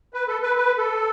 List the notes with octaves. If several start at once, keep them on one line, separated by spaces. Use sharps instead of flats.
B4
A4
B4
B4
A4